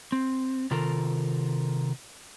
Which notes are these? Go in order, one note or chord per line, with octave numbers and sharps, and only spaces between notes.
C4
C3 D#3 F4 A4 A#4